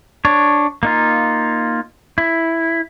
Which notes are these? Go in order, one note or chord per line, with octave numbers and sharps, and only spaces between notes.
D4 C#5
A#3 D#4 F4
E4